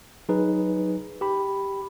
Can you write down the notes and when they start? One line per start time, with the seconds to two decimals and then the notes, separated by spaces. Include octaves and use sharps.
0.29 F#3 D#4 G#4 B4
1.21 G4 B5